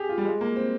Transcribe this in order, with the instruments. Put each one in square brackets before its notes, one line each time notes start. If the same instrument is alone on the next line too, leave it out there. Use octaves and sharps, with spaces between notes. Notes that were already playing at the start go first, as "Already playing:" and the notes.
Already playing: [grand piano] G4 G#4
F4
G3
G#3
A#3
C4